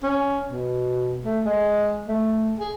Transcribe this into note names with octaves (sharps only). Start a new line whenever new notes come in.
C#4
B2
A3
G#3
A3
G#4